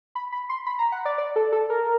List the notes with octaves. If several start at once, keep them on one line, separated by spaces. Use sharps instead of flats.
B5
B5
C6
B5
A#5
F#5
D5
D5
A4
A4
A#4